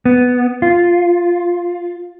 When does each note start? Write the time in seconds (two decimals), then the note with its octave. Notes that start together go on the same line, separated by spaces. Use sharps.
0.06 B3
0.62 F4